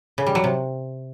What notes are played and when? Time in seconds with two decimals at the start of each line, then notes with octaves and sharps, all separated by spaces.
0.18 C#3
0.26 G3
0.35 F#3
0.44 C3